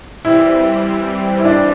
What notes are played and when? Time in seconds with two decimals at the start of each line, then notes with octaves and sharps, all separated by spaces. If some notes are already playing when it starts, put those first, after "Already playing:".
0.24 E3 G3 C4 E4
1.39 E4
1.45 D4